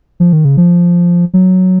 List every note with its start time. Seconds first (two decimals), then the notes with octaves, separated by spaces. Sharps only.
0.20 F3
0.33 D#3
0.45 C#3
0.57 F3
1.34 F#3